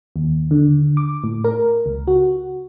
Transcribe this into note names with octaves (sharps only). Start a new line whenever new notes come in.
D#2
D3
D6
A2
A#4
C#2
F#4